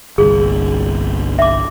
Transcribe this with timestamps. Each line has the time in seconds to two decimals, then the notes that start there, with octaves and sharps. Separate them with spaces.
0.18 G1 C2 G#4
1.39 E5 D6